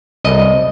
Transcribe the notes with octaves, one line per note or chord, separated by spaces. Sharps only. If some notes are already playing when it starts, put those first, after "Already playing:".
C2 D#5